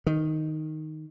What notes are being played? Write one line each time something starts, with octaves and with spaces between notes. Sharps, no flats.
D#3